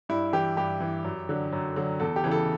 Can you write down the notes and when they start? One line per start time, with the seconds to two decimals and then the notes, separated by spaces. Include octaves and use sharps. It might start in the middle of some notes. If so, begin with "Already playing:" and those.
0.09 G2 E4
0.33 E3 G4
0.57 G2 G4
0.80 E3
1.04 F#2
1.29 D3 F#3
1.52 F#2
1.76 D3 F#3
2.00 E2 A4
2.16 G4
2.24 C#3 E3
2.31 A4